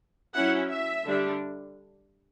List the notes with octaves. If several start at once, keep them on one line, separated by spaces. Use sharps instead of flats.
F#3 C#4 E4 F#5
E5
D3 G3 D4